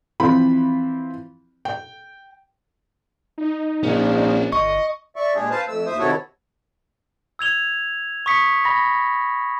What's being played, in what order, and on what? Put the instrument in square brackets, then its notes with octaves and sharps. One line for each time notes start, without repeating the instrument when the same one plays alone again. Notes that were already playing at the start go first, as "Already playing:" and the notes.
[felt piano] E3 F3 C4 B5
G5
[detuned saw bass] D#4
[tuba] A#1 [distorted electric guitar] C#4 D4
[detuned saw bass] G1 [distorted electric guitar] D#5 [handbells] C#6
[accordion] D5 E5 C#6
A#2 G#3 D4 G4 G#4
B4 C5 F5 A5
F2 A3 E6
D#2 C5 E5 D#6
C3 D#3 E4 F#4 A4 C#5
[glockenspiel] E6 G#6 F7 G7
C#6 D#6 B6 C#7
B5 A#6